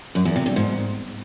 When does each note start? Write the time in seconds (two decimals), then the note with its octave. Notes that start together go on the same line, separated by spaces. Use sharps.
0.15 F#2
0.25 E2
0.36 C3
0.46 G2
0.56 G#2